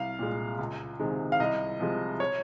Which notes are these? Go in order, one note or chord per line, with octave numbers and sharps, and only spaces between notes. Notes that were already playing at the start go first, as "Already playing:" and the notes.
Already playing: C2 F5
A#2 G#3
C#2
C3 D#3 G#3
F5
C2 D#5
C3 F3 G#3
C#5